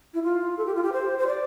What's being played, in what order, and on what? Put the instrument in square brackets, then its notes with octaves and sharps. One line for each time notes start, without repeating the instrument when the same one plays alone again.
[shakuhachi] E4
F4
A4
G4
F4
G4
C5
C5
D5